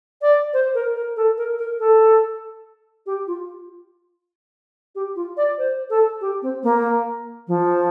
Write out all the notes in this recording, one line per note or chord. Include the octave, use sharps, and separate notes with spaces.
D5
C5
A#4
A#4
A4
A#4
A#4
A4
G4
F4
G4
F4
D5
C5
A4
G4
C4
A#3
F3